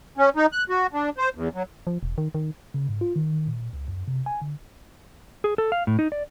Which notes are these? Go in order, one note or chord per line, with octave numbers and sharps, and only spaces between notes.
C#4
D#4
F#6
F#4
D4
C5
E2
F#3
F3
E1
D#3
D#3
C#3
G#2
F4
D#3
A#2
C#2
F#2
C3
G#5
D3
G#4
A4
F5
A2
D#4
D5